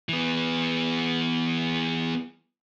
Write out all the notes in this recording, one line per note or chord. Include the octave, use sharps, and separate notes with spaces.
E3 B3